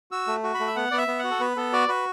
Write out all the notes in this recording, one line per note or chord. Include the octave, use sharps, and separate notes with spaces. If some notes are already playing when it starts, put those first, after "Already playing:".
F#4 E6
A3
F#4
B5
A3
E5
B3 F#5
B3 D5
E5
B3
F#5
F#4
A4
B3 B4
B3 A4
F#4 D5
F#4 B4